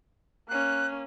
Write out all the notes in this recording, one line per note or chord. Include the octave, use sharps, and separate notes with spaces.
A#3 C#4 F#6